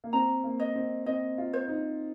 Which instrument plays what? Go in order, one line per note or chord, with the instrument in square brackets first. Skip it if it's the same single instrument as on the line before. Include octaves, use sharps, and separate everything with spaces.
[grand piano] A#3
[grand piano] C4 [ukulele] A#5
[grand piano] A#3
[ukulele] D#5
[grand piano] C4
[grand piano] C4 [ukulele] D#5
[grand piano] F4
[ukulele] C5
[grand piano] D#4